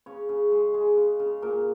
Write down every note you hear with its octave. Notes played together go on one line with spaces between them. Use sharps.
C#3 C#5
C#3
G#3
G#3
C#3
C#3
A#2 A#4